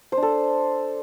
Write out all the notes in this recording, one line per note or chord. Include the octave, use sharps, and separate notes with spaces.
C5
D4
A4